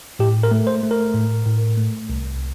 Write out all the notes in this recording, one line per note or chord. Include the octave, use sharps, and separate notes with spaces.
A2 G4
A#4
A3
C5
A3
A#4
A2
A2
A3
C2